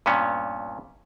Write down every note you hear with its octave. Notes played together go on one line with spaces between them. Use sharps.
G2 A#2 B3 C#4